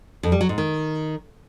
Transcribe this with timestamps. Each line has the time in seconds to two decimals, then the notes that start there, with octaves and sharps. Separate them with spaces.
0.23 F2
0.32 G3
0.41 F#3
0.49 G#2
0.58 D#3